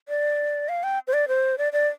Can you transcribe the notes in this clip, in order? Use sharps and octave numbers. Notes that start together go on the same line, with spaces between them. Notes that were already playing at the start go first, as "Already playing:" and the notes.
D5
F5
G5
C5
D5
C5
D5
D5